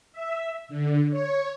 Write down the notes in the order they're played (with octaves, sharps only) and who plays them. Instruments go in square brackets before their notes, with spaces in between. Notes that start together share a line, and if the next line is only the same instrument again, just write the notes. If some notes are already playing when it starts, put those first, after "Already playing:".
[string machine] E5
D3
C#5